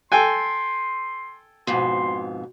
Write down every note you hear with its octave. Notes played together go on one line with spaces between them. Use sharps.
A4 G5 G#5 C6
F2 G#2 B2 C6